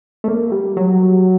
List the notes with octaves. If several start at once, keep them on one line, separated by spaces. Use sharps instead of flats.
A3
A#3
G3
F#3